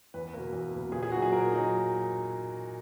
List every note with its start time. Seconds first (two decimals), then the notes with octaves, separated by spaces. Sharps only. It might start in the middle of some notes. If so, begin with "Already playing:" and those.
0.14 E2 B4
0.34 B2 A#3
0.53 E2
0.74 B2 A#3
0.92 A#2 G#4
1.03 G#4
1.12 F#3 A#3 D#4 F#4
1.22 G#4
1.32 A#2 A#4
1.52 F#3 A#3 D#4